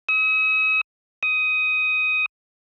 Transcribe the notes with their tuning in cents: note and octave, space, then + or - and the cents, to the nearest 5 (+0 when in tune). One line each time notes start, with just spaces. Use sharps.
D#6 +45
D#6 +15